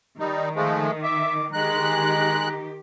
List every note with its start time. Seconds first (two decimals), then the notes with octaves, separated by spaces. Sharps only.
0.19 D#3 G3 D#4
0.55 F3 G#3 A3
1.03 E5 D6
1.53 D#3 G#3 G4 A#5 F#6